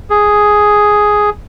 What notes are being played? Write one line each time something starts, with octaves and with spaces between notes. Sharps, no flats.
G#4